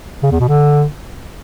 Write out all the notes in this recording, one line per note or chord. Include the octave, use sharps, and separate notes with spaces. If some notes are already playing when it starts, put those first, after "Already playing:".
C#3
E2
B2
D3